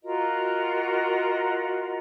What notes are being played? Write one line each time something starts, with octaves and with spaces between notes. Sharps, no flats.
F4 F#4 A#4 D#5